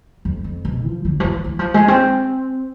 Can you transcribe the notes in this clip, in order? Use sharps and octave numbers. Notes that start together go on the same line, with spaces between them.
F2
F2
B2
F3
D3
F3
E3
E3
F3
G#3
C4